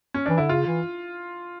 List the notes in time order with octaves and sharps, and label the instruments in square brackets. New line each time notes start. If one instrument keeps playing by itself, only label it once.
[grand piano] C#4
[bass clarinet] E3 [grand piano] D4
[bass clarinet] D3 [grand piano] E4
[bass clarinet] C#3 [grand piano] F4
[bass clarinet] E3